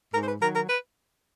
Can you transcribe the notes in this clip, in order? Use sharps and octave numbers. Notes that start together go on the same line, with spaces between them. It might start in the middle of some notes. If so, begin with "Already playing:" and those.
G#2 A#4
C5
B4
D#3 F#3 A#4
A#4
B4